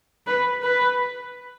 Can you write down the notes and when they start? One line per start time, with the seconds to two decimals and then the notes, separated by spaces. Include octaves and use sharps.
0.27 B4
0.63 B4